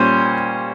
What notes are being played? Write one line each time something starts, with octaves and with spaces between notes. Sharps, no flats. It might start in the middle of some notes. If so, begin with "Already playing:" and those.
Already playing: A#2 G3 C#4 C5